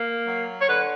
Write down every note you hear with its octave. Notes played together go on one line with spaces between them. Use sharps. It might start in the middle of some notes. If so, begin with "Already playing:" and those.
Already playing: A#3
F#3
C#5
D3 B4